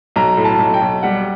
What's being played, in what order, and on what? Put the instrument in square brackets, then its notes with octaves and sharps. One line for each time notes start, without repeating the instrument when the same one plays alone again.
[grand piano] B1 [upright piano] A#5
[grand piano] A2
[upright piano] A5
[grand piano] B1
[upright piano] G5
[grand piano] B1
[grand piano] G3 [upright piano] F#5